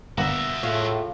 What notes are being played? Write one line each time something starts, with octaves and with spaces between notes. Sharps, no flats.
G1 A#3 B3 F#4 E5
A2 F4 G#4 C#5